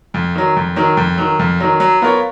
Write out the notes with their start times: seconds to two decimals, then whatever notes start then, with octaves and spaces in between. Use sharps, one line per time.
0.14 F2
0.36 D#3 F#3
0.56 F2
0.76 D#3 F#3
0.97 F2
1.18 D#3 F#3
1.39 F2
1.60 D#3 F#3
1.80 F#3
2.02 B3 F4 A#4 C#5